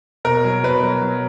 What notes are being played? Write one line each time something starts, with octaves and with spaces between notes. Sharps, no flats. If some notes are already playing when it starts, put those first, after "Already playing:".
B2 A#4
F#3
B2 B4
F#3
F#3